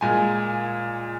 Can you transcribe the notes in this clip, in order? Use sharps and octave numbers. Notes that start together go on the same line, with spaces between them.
A#2 G#3 G#5